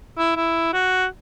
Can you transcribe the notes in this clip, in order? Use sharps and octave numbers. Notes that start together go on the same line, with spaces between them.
E4
E4
F#4